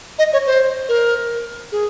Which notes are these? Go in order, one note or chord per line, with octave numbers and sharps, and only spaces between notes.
D#5
C#5
C5
A#4
G#4